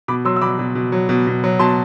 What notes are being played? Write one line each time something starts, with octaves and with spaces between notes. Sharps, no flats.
B2 B5 D6
F#3 C6 E6
E6
B2 B5 D6
B2
B2
F#3
B2
B2
F#3
B2 A5 C6